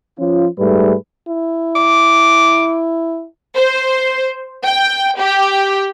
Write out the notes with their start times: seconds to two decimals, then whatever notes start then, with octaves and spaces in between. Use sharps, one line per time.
0.19 F3 C#4 F4
0.59 G#2 G3 A3 G#4 B4
1.28 E4
1.75 D6
3.55 C5
4.65 G5
5.20 G4